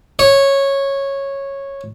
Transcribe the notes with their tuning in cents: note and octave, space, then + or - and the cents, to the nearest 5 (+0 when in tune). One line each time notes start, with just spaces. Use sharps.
C#5 -10